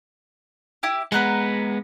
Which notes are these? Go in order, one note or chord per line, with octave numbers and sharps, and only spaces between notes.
E4 G4
G#3 B3 F#5 A#5 F#6